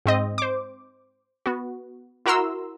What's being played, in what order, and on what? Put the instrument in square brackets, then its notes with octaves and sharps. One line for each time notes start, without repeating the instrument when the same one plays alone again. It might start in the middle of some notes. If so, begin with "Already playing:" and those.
[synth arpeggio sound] G#2 C4 D#5
C5 D6
B3 F#4
E4 F#4 A#4 A#5 C6 E6